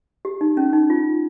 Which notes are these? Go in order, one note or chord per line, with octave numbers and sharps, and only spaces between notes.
G4
D#4
C#4
D#4
F4